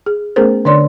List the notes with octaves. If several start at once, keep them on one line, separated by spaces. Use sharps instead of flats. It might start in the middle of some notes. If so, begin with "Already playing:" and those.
G#4
A3 B3 C#4 G#4 A#4 C5
D3 D4 C#5 D5 C6